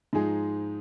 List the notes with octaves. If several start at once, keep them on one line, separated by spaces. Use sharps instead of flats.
G#2 F3 G#3 D#4 G#4